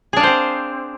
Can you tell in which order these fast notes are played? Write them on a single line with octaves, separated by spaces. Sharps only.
G#4 D4 F5 C5 C4